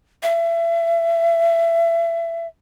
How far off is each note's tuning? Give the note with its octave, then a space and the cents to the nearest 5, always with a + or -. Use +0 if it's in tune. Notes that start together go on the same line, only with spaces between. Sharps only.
E5 +30